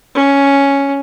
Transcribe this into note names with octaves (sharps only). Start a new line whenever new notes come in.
C#4